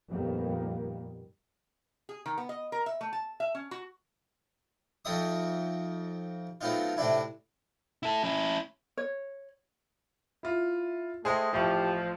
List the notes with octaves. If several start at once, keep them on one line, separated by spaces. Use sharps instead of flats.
F2 A#2 D#3 G3 A#3 B3
G#4
D#3
B3
D#5
A#4
E5
A3
A5
E5
C#4
F#4
F2 F3 C4 D#4 E5 D#6
F#3 A3 B3 C4 D#4 F4
A2 C3 C4 D4 E4
E4 A4
C#4 E4
C#5
E4 F4
G#3 A3 G#4 C5 G5
A1 F3 A3 E4 G4 C#6